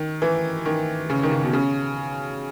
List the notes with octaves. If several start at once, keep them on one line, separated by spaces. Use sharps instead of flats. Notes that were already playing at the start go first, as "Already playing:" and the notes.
Already playing: D#3
E3
D#3
C#3
D#3
C#3
B2
C#3